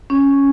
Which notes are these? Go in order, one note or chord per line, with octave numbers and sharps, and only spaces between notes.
C#4